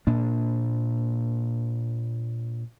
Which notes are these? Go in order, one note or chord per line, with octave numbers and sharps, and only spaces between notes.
A#2 A#3 D4